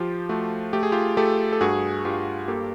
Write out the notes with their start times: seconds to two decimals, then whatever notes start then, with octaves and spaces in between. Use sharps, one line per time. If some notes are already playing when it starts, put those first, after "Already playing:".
Already playing: F3 F4 G4
0.29 A3 F#4
0.73 A3 G4
0.83 G#4
0.92 F4 G4
1.17 A3 G4 A4
1.53 A4
1.61 G2 F#4 G#4
2.05 G2 F4 G4
2.48 A#3 G4 A4